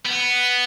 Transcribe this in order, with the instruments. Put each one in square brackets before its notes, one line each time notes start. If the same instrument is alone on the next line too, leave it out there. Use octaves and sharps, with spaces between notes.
[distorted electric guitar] B3